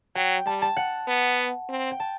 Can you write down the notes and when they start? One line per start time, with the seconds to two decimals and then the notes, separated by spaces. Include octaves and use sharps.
0.15 F#3 G5
0.46 G3 A5
0.62 A5
0.77 F#5
1.07 B3
1.69 C4
1.91 G5
2.00 A5